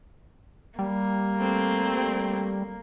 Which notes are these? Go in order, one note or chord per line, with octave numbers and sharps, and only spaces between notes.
G3 A#3
A3 C4